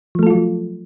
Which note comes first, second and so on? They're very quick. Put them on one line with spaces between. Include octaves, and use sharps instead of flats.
F3 A3 A4 F4 F#3